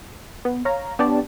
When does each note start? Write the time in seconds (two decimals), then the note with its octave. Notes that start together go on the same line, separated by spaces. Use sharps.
0.45 B3
0.65 C#5 F5 A#5
0.99 B3 D4 G4 C#5 D5 A5